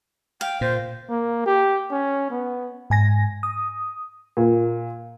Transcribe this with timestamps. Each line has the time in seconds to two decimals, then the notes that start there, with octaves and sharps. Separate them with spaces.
0.41 F5 G5
0.61 A#2 C5
1.09 A#3
1.46 G4
1.91 C#4
2.31 B3
2.90 G#2 G#5 A#6
3.43 D#6
4.37 A#2